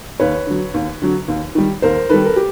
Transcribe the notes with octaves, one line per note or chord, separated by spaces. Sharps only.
D#2 B4 C#5
D3 F#3
D#2
D3 F#3
D#2
D#3 G3
D#2 A#4 C5
D#3 G3 A4 B4
A#4
G4